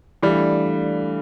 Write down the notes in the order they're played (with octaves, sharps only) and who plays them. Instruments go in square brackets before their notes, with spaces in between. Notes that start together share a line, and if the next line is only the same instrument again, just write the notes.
[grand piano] E3 G3 [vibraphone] A3 D4 A4 D5 F5